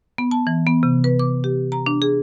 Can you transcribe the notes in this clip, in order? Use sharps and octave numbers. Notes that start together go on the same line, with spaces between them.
B3
A5
E3
B3
C3
B4
D6
G4
A#5
D4
G#4